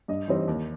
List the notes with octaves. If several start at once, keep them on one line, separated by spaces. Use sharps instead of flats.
G2 D#5
E3 G3 C4 D#4
D#2